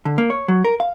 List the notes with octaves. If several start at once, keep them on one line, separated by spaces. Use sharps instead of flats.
D3
A#3
C#5
F#3
A#4
F5